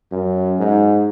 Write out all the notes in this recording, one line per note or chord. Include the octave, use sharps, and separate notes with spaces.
F#2
G#2